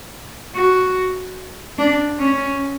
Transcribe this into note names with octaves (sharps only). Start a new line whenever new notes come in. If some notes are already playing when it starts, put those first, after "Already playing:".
F#4
D4
C#4